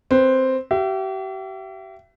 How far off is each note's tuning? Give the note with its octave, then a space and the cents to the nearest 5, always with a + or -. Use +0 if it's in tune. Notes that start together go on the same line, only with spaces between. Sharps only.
C4 +0 B4 +0
G4 -40 E5 +30